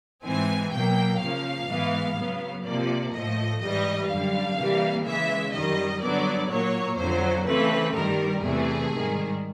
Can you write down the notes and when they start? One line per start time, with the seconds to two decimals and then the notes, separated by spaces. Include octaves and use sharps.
0.24 G#2 E3 G#3 C4 G#5
0.72 B2 F#3 A#3 G5
1.20 C#3 F3 A#3 F5
1.68 G#2 E3 G#3 B3
2.17 C#3 F#3 B3
2.64 C3 F3 A#3 D5
3.13 A2 F3 A3 D#5
3.61 G#2 E3 G3 D#5
4.09 F#2 D3 G3 F5
4.57 C3 E3 G3 A#3
5.05 C#3 E3 G#3 E5
5.53 F#2 D#3 G3 D#5
6.02 G2 D3 F#3 B3 D5
6.49 A#2 F#3 A#3 C#5
6.98 F2 D3 F#3 C5
7.46 C#3 E3 A3 C4 B4
7.94 G2 D#3 G3 A#4
8.42 E2 C3 E3 A3 G#4
8.91 G#2 D#3 G3